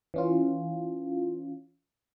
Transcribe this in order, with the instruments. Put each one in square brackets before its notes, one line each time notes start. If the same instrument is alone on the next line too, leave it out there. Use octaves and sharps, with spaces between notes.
[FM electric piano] E3 C#4 F4